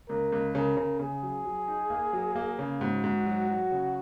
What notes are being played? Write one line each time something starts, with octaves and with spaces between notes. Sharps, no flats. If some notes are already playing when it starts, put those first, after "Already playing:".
C#2 A#4
C#2
C#3 A#4
C#3
C#3 G#4
F#3
F#3
D#4
A#3
F#3
A#3
C#3
G#2 F#4
G#2
F#3
F#3
C#3